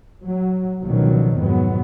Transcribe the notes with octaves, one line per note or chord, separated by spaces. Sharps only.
F#3
C#2 B2 D3 D#3 F3 F#3
F2 G#2 B2 F#3 B3